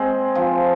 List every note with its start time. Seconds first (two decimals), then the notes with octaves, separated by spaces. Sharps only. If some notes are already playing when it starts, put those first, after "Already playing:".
Already playing: G#3 C4
0.35 F3